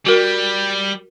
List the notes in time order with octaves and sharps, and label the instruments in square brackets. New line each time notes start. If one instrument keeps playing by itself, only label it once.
[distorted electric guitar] G3 [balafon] F#4 A#4